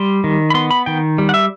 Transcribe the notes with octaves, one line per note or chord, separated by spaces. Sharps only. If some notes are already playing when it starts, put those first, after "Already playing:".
Already playing: G3 C6
D#3
B5
B3 C6
B5
D#3 G5
G3
F#5
E5